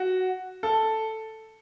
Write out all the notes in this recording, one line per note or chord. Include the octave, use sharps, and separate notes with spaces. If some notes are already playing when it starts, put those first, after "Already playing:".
Already playing: F#4
A4